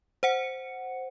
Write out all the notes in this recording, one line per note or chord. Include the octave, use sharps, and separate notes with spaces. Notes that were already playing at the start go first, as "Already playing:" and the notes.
C5 F#5 C#7